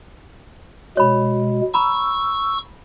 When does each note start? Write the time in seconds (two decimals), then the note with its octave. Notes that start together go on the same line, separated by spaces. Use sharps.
0.97 B2 G#3 C#5 B5
1.74 A#5 B5 C#6 E6